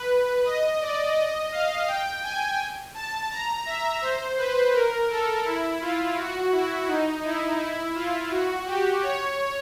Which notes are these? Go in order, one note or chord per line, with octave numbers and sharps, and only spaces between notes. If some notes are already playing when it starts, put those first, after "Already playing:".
Already playing: B4
D#5
D5
D#5
F5
G5
G#5
A5
A#5
E5
C5
B4
A#4
A4
E4
F4
F#4
E4
D#4
E4
E4
F4
F#4
G4
C#5